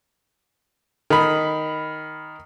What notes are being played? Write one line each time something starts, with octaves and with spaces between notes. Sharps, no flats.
D#3 B5